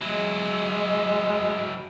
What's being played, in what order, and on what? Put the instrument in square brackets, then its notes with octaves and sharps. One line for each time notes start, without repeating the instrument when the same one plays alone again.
[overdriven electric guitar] F#3 E4 [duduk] G#3